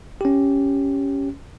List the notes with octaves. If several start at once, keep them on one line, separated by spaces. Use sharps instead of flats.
C#4 G4